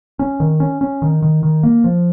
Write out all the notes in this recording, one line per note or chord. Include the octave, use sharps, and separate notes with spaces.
C#4
D#3
C#4
C#4
D#3
D#3
D#3
A#3
F3